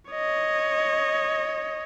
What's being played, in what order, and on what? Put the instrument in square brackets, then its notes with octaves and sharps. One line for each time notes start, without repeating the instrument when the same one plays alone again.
[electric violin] C#5 D#5